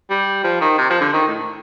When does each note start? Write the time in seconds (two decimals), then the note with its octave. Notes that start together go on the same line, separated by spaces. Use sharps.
0.10 G3
0.44 F3
0.61 D#3
0.78 C3
0.90 F3
1.01 D3
1.13 D#3
1.28 A2